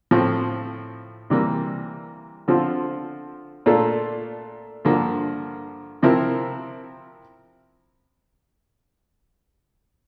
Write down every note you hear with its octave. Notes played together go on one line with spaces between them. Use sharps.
A2 F3 C4
C3 E3 G3 A#3
D3 F3 C4 F4
A#2 A3 D4 F4 A4
G2 D3 F3 A#3
C3 F3 C4 E4 A#4